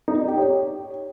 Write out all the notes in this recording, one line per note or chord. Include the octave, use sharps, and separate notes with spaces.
D#4
D5
G4
C#5